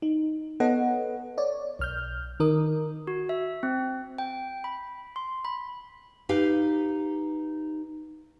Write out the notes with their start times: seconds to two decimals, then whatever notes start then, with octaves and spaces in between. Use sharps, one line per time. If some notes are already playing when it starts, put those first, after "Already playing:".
0.02 D#4
0.60 B3 A4 B4 C#5 D#5 F#5
1.38 C#5 D5
1.79 B1 F6 G6
2.40 D#3 D#4 A#4 D#6
3.07 F#4
3.29 E5
3.63 C4
4.18 G5
4.64 B5
5.16 C6
5.45 B5
6.29 D#4 G4 B4 F5